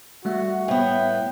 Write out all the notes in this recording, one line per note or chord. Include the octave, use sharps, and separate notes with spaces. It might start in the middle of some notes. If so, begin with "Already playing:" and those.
G3 A3 F#4 E5
A2 B3 G5